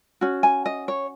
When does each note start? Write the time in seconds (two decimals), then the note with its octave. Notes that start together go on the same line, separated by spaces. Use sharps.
0.21 C#4 F#4
0.43 G#5
0.66 D#5
0.88 C#5